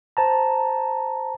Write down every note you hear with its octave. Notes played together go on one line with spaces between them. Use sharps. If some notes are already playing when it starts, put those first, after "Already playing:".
C5 A5 A#5